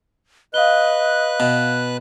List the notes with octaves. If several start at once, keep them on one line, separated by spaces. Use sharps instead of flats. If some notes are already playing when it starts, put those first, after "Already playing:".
B4 D#5 F5 F#6 G7
B2